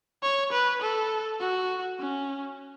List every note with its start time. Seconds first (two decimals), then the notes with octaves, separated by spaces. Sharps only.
0.23 C#5
0.52 B4
0.82 A4
1.41 F#4
2.00 C#4